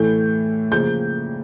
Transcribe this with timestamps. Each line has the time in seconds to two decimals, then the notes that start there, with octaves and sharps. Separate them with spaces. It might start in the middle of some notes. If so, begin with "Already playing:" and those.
Already playing: A2 E3 A3 G6
0.71 C#3 F3 A#3 G6